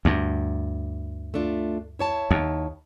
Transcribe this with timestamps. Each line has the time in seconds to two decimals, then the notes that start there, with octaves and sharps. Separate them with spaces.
0.05 D2 G2
1.34 A3 D4 F4
1.99 E4 C#5 A5
2.31 D#2